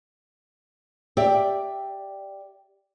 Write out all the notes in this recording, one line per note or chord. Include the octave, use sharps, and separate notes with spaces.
G4 D5 E5